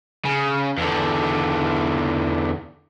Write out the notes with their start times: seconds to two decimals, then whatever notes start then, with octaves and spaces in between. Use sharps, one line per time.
0.25 C#3
0.78 E2 D3